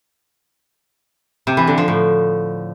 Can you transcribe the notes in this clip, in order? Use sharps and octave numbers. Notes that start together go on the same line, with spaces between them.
C3
E3
D3
F3
A2